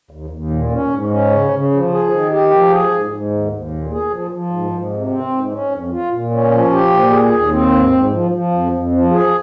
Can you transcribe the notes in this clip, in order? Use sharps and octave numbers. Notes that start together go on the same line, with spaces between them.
D#2
D#2
A#2
C#4
G#2
C#4
C#3
C#3
F3
G#4
D#3
G4
F3
G#4
G#2
G#2
D#2
D#2
A#2
G#4
F3
F3
G#2
G#2
C3
C4
G#2
C#4
F2
F4
A#2
C#4
F3
G4
A#2
G#4
D#2
C4
G#2
G#2
F3
F3
F2
F2
F3
G#4